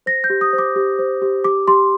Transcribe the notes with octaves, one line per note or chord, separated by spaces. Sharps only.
C5 A#6
G6
G4
D#6
C5
D6
G4
C5
G4
G4 D6
G4 C6